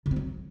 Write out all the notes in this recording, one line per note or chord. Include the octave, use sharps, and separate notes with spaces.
D3
C4
F#3